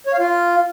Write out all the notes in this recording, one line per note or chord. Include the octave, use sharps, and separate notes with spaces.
C#5
F5
F4